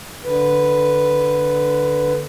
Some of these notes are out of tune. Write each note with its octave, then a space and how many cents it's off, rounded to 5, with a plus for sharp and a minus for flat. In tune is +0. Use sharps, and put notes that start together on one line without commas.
D3 +0 B4 +0